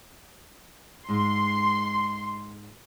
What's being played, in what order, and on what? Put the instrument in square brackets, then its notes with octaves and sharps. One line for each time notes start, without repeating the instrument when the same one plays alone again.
[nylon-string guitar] G#2 G#3 [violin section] C6